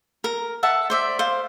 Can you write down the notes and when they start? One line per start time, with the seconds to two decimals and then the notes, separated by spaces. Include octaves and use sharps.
0.24 A#4
0.63 E5 F#5 A5
0.90 C5 D5 E5
1.19 C5 F5